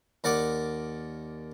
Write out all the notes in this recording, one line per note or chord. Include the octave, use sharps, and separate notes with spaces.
D#2 A#4 D5 F#5 D6